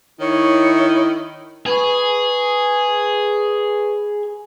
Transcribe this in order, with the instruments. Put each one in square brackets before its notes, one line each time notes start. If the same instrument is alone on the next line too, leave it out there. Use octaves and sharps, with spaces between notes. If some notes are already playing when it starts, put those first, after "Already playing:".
[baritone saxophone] D#3 [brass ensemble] E4 [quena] C#5
[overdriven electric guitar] G#4 [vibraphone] B4 B5 C#6